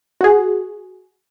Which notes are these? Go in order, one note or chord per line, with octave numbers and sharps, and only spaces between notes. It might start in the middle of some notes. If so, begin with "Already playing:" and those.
F#4 G#4